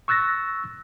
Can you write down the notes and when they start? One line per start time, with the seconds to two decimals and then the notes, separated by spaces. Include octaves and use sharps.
0.08 C#6 E6 F#6 A6 A#6